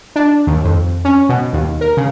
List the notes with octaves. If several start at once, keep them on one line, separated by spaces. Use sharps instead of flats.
D4
D#2
F2
C#4
B2
D#2
A#4
C#3